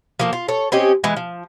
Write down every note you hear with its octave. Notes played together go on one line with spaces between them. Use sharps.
F3 A#3 A4
F4
A4 C#5
C4 C#4 G4 D#5
E3 G#3 E4
F3